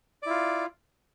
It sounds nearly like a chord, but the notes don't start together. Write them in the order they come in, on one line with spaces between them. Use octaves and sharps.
D5 E4 F4